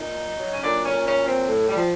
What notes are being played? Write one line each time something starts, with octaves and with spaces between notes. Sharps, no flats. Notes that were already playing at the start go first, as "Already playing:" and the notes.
Already playing: A#2 D#4
F#3
F#3
C#4
A#2 D4
C#4
A#2
C#4
F#3
C4
A2
G3
F3